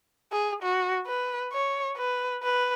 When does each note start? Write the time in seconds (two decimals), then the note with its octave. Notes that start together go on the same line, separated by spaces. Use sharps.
0.32 G#4
0.62 F#4
1.07 B4
1.52 C#5
1.97 B4
2.43 B4